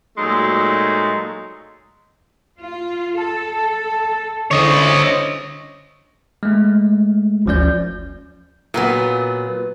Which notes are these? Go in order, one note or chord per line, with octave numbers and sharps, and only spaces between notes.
A#2 F#3 G#3 A3 D#4
F4
A4 A5
D3 C#4 E4 C5 C#5 D#5
G#3 A3
G1 D2 F3 C#4 D5 G6
A#2 F#3 B3